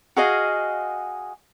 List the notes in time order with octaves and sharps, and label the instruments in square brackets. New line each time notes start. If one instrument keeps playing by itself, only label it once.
[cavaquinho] F#4 G#4 D#5 F5